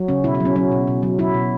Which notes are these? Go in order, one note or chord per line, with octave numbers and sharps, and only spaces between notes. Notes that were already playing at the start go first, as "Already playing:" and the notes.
Already playing: F#3
C#3 C#4
B2 E4
E4
F#3 C#4
F#3 C#4
B2
B2
F#3
F#3 E4
B2